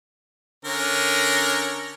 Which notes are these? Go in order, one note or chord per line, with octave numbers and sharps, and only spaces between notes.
D3 C#4 A#4